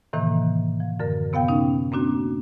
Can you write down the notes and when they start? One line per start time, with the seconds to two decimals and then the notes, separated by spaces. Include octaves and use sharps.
0.13 A2 C3 D#3 E3 A#3
0.80 F3
1.00 F#2 D3 A#4
1.33 C3 B3 F5 G5
1.48 C#4 D#4
1.92 A#3 C4 D4 F#4